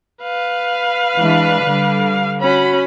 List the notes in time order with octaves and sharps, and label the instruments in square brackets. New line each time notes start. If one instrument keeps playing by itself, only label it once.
[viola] B4 F5
[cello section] E3 G#3 D4
D3 G3
[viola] C#4 B5 [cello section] F#4